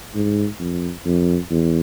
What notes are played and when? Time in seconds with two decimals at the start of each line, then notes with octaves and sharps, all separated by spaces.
0.15 G#2
0.59 F2
1.06 F2
1.50 E2